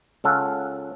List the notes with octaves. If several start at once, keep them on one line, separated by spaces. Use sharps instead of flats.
C#2 C#4 A4 F5 F#5